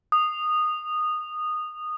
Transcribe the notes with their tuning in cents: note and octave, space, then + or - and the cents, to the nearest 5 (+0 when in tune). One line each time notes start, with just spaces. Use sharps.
D#6 -15